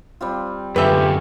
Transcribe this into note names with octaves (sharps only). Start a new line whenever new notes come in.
G3 C4 F4
F#2 D3 G#3 A3 F4 G4 B4 E5